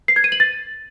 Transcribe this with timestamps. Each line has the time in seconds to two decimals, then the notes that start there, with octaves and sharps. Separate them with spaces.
0.08 C7
0.16 G#6
0.24 D#7
0.32 F#7
0.40 A6